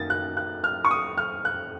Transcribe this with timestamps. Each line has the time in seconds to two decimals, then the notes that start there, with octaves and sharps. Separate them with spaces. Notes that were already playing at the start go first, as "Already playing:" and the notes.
Already playing: F#2 D#3 F#3 A#3 A6
0.10 F#6
0.37 F#6
0.64 F6
0.85 C#6
0.91 D#6
1.18 F6
1.45 F#6